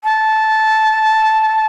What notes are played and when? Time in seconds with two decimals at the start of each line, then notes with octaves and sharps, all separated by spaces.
0.04 A5